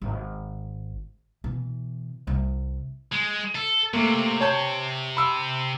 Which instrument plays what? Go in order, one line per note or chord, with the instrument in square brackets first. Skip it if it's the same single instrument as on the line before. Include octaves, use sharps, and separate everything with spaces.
[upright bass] G#1
B2 E3
C2
[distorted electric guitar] G#3
A4
[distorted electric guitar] C3 [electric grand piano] A3 A#3
[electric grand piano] C#5 A5 G6
B5 E6